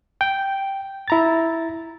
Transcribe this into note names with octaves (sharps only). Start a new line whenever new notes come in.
G5
E4 A#5 A6